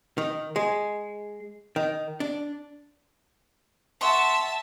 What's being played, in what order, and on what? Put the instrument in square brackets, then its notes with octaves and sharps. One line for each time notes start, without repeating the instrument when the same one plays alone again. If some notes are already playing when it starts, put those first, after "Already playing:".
[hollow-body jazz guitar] D#3
G#3
D#3
D4
[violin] E5 A5 [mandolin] F#5 C6 C#6